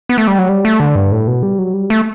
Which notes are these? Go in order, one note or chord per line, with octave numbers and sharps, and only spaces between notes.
B3
A3
G3
F#3
G3
A3
D3
G2
A2
B2
G3
F#3
G3
A3